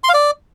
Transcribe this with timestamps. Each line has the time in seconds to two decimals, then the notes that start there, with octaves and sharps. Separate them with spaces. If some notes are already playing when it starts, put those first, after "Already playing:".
0.04 C6
0.09 F5
0.14 D5